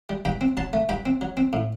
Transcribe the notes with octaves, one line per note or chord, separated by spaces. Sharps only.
G3
G2 G5 B5
C4
F#3 A5 C6
A3
G2 G5 B5
C4
F#3
C4
A2